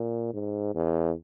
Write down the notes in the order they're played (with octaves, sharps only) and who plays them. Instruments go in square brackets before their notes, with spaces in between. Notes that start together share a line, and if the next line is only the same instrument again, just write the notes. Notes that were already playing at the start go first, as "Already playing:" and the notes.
Already playing: [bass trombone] A#2
G#2
E2